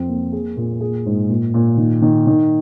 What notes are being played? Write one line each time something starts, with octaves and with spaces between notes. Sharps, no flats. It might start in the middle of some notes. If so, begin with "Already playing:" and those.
Already playing: F2 C4
A#3
G#4
A#2
G#4
G#2
A#2
A#2
D#3
D#3
D#3